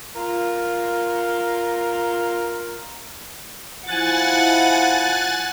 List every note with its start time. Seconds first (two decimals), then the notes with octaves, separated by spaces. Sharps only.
0.16 F4 A#4
3.87 F3 E4 F#5 G#5 F#6 A6